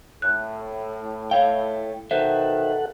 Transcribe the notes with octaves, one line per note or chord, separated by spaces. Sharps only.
A2 F#6
A3 C#5 F5 G5
B2 D#3 A4 B4 C5 E5 F#5